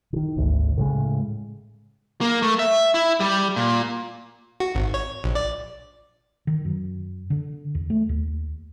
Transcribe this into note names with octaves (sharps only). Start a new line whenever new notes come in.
D3 D#3
G#1 D2
A2 C#3 G#3
A#3
A3
E5
E4
G3
A#2
F#4
G#1
C#5
A#1
D5
D#3
F#2
D3
E2
A3
D#2